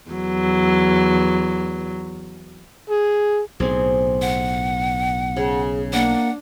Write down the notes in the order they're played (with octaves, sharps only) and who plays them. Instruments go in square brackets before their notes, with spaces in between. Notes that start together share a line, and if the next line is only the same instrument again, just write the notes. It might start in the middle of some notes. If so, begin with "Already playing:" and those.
[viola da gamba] E2 F#3
[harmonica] G#4
[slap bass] B1 A2 [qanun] C4 G#4
[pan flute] F#5
[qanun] C#3 [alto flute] G#4
[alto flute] A#3 [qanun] D4 [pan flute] F#5